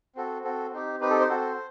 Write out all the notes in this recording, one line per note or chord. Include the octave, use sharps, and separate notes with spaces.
C4 F#4 A4
C4 F#4 A4
C4 D#4 G4
C4 D#4 G4 B4
A4
C5
C4 F#4 A4